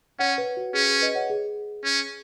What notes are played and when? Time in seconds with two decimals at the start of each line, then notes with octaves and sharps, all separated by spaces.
0.19 C#4 C#5 F#5
0.38 B4
0.57 F#4
0.74 C#4 G#4
0.88 G#4
1.02 B4 D#5
1.15 C#5 F#5
1.30 G#4
1.84 C#4